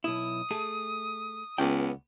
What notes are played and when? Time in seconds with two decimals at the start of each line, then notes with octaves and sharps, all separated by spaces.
0.04 B1 E4 D#6
0.51 A3 G#4
1.58 C#2 B3 G5